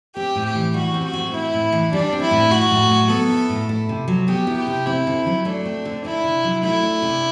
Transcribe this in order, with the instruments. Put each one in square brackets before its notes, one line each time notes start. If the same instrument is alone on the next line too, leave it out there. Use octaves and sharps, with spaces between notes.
[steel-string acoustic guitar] C4 [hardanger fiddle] G4
[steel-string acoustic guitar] A2
[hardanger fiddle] G4
[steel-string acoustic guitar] E3
[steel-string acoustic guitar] G3 [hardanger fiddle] F#4
[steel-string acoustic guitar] C4
[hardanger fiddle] F#4
[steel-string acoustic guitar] A2
[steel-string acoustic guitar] C4 [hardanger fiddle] E4
[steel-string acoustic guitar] A2
E3
[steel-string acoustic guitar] G3 [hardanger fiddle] D4
[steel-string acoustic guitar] C4
[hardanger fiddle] E4
[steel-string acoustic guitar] A2
[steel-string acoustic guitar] E4 [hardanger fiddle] F#4
[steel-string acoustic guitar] A2
F#3
[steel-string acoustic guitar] B3 [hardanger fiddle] A4
[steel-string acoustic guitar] E4
A2
E4
C3
F#3
[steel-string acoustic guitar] B3 [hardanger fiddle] G4
[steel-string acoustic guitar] E4
[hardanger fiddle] G4
[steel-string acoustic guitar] C3
[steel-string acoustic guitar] C4 [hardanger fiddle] E4
[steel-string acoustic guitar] D3
F#3
[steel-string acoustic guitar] A3 [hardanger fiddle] D4
[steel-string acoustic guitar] C4
D3
[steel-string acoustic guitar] D4 [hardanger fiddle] E4
[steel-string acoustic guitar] C3
F#3
[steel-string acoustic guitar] A3 [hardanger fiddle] E4
[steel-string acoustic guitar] D4
C3